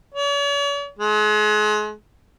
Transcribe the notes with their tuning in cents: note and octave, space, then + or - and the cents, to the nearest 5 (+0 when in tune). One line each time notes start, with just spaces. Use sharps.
C#5 +45
G#3 +35